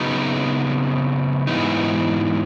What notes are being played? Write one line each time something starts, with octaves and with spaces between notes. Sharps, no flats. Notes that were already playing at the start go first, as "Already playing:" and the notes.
Already playing: C#3 F#3 B3 D#4
G#2 E3 B3 D#4